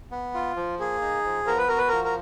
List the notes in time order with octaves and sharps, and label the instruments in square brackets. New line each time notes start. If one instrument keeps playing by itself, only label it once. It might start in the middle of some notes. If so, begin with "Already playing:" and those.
[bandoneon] B3
F4
F3
[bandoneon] A#3 [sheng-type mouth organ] G#4
[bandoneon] D#4
F3
[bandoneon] B3 [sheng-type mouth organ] A#4
[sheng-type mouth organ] B4
[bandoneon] F#4 [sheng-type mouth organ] A#4
[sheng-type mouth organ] B4
[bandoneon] F3 [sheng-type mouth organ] A#4
[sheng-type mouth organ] A#4